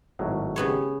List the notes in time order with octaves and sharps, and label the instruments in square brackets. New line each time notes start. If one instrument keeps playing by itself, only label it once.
[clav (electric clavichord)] G#1 A2 F#3
[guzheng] C#3 B3 C#5 [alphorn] G4